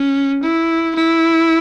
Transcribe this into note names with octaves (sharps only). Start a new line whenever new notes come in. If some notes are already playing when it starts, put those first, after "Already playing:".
Already playing: C#4
E4
E4